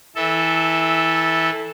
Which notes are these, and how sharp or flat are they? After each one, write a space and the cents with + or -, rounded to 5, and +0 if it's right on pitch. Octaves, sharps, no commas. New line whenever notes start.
E3 -20 A4 +0 E5 -15